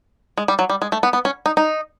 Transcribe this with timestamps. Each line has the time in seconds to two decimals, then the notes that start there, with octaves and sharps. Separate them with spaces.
0.37 G#3
0.48 G3
0.59 F#3
0.70 G3
0.82 G#3
0.92 A3
1.03 B3
1.13 B3
1.25 C#4
1.46 D#4
1.57 D#4